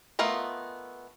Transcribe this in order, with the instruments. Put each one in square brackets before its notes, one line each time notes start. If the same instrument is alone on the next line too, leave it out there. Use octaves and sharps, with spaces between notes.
[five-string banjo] A3 B3 F4 A#4 D#5